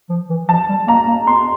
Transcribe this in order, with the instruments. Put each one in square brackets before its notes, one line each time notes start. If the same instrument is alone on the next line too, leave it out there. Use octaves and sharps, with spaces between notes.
[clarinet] F3
E3
[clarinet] F3 [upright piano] A5
[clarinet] G3
[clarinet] A#3 [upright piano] A#5
[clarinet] A#3
[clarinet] B3 [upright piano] C6